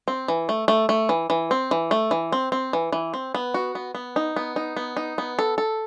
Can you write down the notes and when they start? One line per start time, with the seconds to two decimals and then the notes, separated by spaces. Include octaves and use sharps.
0.08 C4
0.28 E3
0.49 A3
0.68 A3
0.89 A3
1.09 E3
1.30 E3
1.51 C4
1.71 E3
1.91 A3
2.11 E3
2.32 C4
2.52 C4
2.73 E3
2.92 E3
3.14 C4
3.35 B3
3.54 F#4
3.75 B3
3.95 B3
4.16 D#4
4.36 B3
4.56 D#4
4.77 B3
4.97 D#4
5.18 B3
5.39 A4
5.58 A4